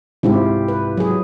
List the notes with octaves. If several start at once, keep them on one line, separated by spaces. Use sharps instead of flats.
C2 G#2 C3 E4 F4 G4
B4
F#3 G#4